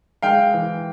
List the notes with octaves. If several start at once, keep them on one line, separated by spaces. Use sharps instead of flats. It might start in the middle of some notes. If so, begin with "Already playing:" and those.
G#3 F5 G5
E3